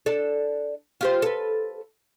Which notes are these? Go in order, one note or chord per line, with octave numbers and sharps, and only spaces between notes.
D4 A4
F4 G4 C5
A4 B4